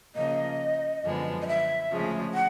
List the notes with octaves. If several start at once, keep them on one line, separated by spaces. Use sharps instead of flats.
C#3 F3 A#3 D#5
F#2 D3 F3 G#3 B3
D#5
E5
D2 C#3 F3 G#3
F#5